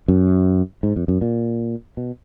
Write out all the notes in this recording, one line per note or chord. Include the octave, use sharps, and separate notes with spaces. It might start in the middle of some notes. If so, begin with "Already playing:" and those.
F#2
G#2
F2
F#2
A#2
B2